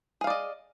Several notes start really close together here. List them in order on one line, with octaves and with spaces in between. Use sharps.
G#4 F5 D5 D#5